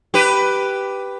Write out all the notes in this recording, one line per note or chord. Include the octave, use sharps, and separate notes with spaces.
G4 B4